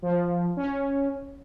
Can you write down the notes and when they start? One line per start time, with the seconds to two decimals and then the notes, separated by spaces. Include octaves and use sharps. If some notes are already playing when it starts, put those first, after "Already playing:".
0.02 F3
0.57 C#4